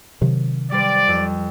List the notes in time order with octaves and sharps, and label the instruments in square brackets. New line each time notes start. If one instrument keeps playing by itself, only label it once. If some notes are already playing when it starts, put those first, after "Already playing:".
[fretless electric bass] C3 D#3 F#3
[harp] G3 C5 [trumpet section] D5
[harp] F2